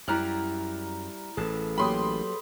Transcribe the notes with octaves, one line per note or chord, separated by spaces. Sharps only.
F#2 G3 E4 A#5 F6 F#6
A1 G#4 A4 B4 A5
F#3 A#3 G4 B5 C6 D#6